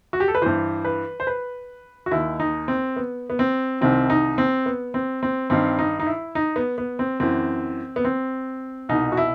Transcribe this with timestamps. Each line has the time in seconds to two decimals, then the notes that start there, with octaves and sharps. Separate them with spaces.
0.13 F#4
0.20 G4
0.28 A4
0.35 B4
0.42 G2 E3 C5
0.85 B4
1.20 C5
1.27 B4
2.06 F#4
2.11 D#2 D#3 E4
2.40 D#4
2.68 C4
2.96 B3
3.30 B3
3.39 C4
3.81 C2 C3 D#3 C4
4.10 D#4
4.38 C4
4.66 B3
4.94 C4
5.23 C4
5.50 G2 D#3 C4
5.79 D#4
6.00 D#4
6.06 E4
6.35 D#4
6.56 B3
6.78 B3
6.99 C4
7.20 F#2 E3 C4
7.96 B3
8.05 C4
8.89 C2 B2 D#4
9.12 F#4
9.17 E4